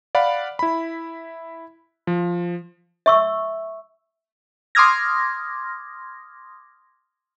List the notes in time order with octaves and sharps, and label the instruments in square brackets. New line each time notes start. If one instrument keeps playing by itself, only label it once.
[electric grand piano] D5 F5 F#5 B5
E4 B5
F3
[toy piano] E5 C#6 E6
[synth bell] C6 D6 D#6 F6 G#6 A#6